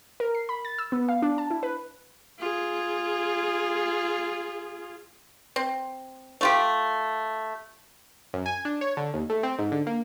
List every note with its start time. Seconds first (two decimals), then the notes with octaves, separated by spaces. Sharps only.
0.20 A#4
0.35 C7
0.49 B5
0.65 A6
0.78 E6
0.92 B3
1.09 F5
1.22 D4
1.38 A5
1.51 E4
1.63 B4
2.39 F4 G#4
5.56 C4
6.41 A3 F4 G4
8.34 F#2
8.46 G#5
8.65 D4
8.81 C#5
8.97 D3
9.14 D#2
9.30 A3
9.43 C4
9.59 G#2
9.72 D3
9.87 A#3